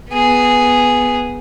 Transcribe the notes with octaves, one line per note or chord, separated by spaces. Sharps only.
B3 G#4